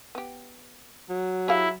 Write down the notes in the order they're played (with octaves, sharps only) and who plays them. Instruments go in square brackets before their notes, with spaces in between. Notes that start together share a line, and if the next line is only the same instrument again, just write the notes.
[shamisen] B3 G4
[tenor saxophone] F#3
[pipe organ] E4 [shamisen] G4 G#4 F5